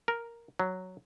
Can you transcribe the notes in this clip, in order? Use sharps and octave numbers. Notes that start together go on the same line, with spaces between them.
A#4
F#3